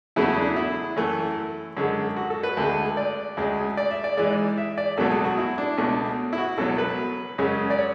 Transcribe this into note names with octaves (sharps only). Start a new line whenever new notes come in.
E2 C#3 F#3 A3 E4
D4
E4
F#2 E3 A3
F#2 D3 G#3
F#4
A4
B4
D2 D3 G#3
D5
D2 C#3 G#3
D5
E5
D5
G#2 E3 G#3 D5
E5
D5
C#2 B2 F#3 A3 A4
G#4
F#4
E4
D4
C#2 B2 A3
E4
F#4
C#2 B2 F#3 A4
B4
F#2 C#3 G#3
D5
C#5